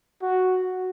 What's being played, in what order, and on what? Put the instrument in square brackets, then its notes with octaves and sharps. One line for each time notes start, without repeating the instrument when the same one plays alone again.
[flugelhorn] F#4